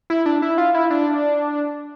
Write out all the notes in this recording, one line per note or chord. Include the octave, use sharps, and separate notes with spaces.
E4
D4
E4
F4
E4
D4